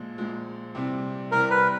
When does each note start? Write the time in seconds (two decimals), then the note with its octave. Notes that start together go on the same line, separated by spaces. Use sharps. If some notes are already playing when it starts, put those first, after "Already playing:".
Already playing: A#1 A#2 F3 G#3
0.18 A#1 A#2 F3 G#3
0.75 C3 E3 G3 C4
1.32 C3 E3 G3 C4 A#4
1.51 B4